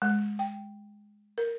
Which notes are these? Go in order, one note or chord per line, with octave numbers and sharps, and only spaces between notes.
G#3
G5
A#4